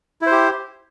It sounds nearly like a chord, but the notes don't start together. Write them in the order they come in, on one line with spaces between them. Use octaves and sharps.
E4 C5 G4